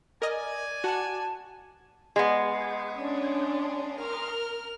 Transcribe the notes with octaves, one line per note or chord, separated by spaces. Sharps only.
A#4 D5 D#5 G#5
F#4 F#5 A5
G#3 B3
C#4 D4
A#4 F6